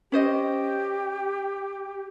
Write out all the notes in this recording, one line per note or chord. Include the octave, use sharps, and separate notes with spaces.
C#4 G4 C5 D#5